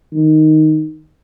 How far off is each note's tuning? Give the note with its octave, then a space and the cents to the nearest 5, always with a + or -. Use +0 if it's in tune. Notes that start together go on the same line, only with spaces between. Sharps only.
D#3 +0